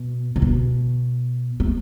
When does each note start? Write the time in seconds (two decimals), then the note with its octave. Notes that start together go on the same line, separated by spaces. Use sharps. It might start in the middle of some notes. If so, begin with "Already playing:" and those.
Already playing: B2
0.36 C3
0.42 B2
1.60 A3